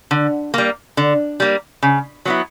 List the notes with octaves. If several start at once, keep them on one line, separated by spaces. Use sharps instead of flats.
D3
G3 A#3
D3
G3 A#3
C#3
F#3 B3 E4